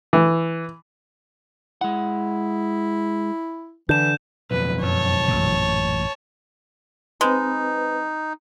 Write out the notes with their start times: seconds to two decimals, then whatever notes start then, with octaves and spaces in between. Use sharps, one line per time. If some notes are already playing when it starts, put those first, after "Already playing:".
0.13 E3
1.81 G#3 E4 F#5
3.89 D3 E3 G6 E7
4.51 B1 F2 B4
4.83 F#2 C#5 A5
5.28 A1 F#2 A#2
7.21 G#3 C4 D#4 B4